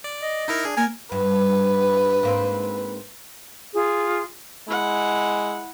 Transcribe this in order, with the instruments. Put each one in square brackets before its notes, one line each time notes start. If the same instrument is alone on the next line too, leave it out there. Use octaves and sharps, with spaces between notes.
[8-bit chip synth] D5
[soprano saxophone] D#5
[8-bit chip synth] D#4 E4 A#4
[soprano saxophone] D4 [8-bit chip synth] G#4
[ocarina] A#3 [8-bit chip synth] A#4 [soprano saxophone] G#5
[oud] G2 [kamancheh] B4
[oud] G#2 A#3 C4
[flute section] F4 G#4
[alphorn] G#3 [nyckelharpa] E4 F#5